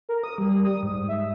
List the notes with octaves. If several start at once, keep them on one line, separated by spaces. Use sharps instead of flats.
A#4
D#6
G3
D#6
G#2
E5